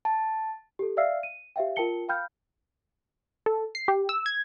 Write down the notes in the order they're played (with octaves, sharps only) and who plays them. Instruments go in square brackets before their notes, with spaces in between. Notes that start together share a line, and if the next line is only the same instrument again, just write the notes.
[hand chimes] A5
[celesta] G4 A4
D5 E5 F5 E6 F6 C7
D#7
G4 C5 E5 F5 G5
F4 A#4 G5 A5 C#7 G7
F5 G5 B5 F6 G6
[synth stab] A4
C7
G4
E6
G#6